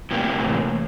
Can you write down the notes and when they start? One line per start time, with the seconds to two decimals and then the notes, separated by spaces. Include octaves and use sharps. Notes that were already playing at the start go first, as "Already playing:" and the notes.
0.11 A2 C3 A#3
0.41 A1